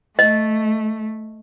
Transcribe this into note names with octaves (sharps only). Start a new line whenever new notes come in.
A3 D#5